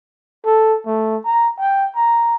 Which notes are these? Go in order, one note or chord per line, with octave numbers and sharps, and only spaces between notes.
A4
A3
A#5
G5
A#5